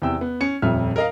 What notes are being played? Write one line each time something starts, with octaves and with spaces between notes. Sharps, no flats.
E2 C3 G5 E6
B3
C#4 C#7
D#1 F2 E5 F6
A#4 D#5 F5